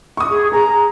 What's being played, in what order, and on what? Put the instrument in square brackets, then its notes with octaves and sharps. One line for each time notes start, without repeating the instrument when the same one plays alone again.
[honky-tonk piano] C#6 D#6
[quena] G#4
[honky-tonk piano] G#4 [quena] A#5